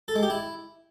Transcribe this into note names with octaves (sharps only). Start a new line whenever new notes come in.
A4
G#3
G4
E4